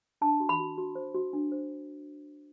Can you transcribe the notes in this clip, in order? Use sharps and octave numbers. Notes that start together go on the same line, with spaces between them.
D4 A5
F#4
B5
F#4
F#4
C5
F#4
D4
C5